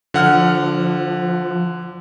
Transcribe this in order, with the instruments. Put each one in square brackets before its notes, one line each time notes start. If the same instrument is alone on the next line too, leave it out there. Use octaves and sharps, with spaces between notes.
[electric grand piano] D3 F#5 F6 [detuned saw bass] F3